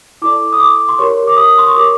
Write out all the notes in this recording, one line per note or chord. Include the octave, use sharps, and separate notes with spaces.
E4 A4 D5 D6
D#6
D6
C6
G4 A#4 C#5 C#6
D6
D#6
C6
C#6
G4 A#4 C#5 D6